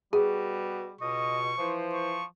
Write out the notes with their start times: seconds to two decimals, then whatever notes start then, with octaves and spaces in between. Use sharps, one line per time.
0.13 B2 G3 B3 F#4 G#4
1.01 C#2 B2 D#5 C#6
1.58 E3 F3 C5
1.93 C#6